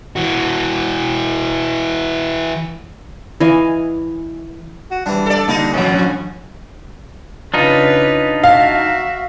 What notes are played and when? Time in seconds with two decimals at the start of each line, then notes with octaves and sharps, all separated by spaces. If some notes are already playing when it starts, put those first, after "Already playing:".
0.16 E3 F#4
3.40 E3 D#5 F5 G#5
4.91 F#4
5.06 E3 G3 D4
5.26 A4 D5
5.48 D3 G3 A#3 D#4 A#4
5.74 A1 B2 F3 C#4
5.94 F#3 D4
7.54 C#3 D4 D#4 F4 B4
8.44 F#4 E5 F5